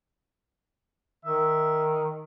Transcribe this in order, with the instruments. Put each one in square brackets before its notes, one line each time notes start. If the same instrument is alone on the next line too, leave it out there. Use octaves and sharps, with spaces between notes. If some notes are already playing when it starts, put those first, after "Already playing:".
[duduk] D#3 [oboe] E5